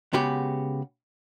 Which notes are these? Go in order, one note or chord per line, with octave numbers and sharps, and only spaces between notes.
C#3 G#3 B3 F#4 G4